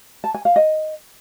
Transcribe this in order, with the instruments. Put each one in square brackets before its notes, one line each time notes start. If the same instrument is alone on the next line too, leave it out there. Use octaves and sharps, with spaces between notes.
[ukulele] A5
G#5
F5
D#5